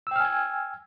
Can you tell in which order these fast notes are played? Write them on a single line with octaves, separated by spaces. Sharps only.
E6 G5 F6 G#5 G#6